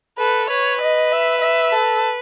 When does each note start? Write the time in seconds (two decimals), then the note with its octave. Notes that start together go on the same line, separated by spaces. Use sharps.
0.19 A4 B4
0.50 B4 C#5
0.81 D#5
1.12 E5
1.42 E5
1.72 A4